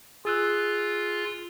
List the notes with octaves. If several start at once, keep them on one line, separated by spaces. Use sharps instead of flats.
F4 G#4 E6 F#6